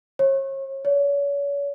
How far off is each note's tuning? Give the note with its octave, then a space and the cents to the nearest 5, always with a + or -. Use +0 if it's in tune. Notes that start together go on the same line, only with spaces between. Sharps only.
C#5 -40
C#5 +35